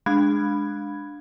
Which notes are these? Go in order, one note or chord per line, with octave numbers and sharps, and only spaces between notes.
G#3 D4 B5 F#6 G#6